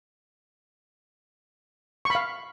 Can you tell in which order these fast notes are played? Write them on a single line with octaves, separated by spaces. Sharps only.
C#6 B5 F5